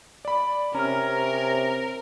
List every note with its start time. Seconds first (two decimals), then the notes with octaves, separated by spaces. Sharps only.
0.25 D5 B5
0.75 C3 C#4 A#4 A#5 F6